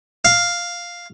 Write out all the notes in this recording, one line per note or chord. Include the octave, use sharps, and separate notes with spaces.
F5